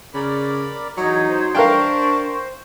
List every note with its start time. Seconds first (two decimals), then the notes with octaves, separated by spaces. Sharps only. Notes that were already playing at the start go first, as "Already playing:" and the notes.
0.14 C#3 A#4 D5 B5
0.97 E2 F#3 D#4 G#6
1.29 C5
1.54 D4 A#4 F5 G5 C#6